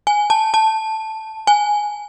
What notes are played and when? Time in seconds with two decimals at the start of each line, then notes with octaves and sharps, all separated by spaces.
0.07 G#5
0.30 A5
0.54 A5
1.47 G#5